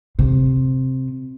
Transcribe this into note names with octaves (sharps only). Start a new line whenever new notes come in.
C3